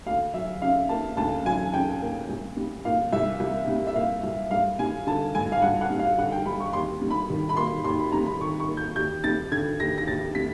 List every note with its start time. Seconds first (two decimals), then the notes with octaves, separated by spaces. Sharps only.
0.06 D2 F5
0.34 F#3 E5
0.62 C#3 F5
0.89 A#3 A5
1.17 D2 A5
1.45 F#3 G#5
1.73 C#3 G5
2.01 A#3
2.29 C2
2.57 G3
2.85 A#2 F5
3.12 C2 E5
3.40 C2
3.67 G3
3.87 E5
3.95 A#2 F5
4.23 C2
4.51 G2 F5
4.79 G3 G#5
5.07 D3 A5
5.35 G2 G#5
5.52 F5
5.62 G2 F#5
5.81 F#5
5.90 G3
5.99 F5
6.18 D3 F#5
6.32 G5
6.46 G2 B5
6.60 C#6
6.73 D#2 C6
7.02 G3
7.10 B5
7.30 D#3
7.49 B5
7.57 A#3 C6
7.84 D#2 C6
7.99 B5
8.12 G3 A#5
8.26 B5
8.41 D#3 C#6
8.60 C#6
8.68 A#3
8.77 G6
8.96 D#2 G6
9.24 G3 A6
9.52 D3 G#6
9.80 D#2 A#6
9.98 A#6
10.08 D#2 A6
10.35 G3 B6